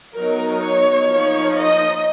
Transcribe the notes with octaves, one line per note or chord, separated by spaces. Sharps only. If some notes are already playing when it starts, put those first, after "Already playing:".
F#3 B3 D#4 A#4
C#5
F3 A#3 D#4
D#5